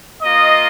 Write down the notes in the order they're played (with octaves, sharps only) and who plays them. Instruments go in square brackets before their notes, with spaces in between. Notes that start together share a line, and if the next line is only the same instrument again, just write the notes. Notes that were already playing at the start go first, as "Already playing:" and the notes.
[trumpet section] A#3 F4 D#5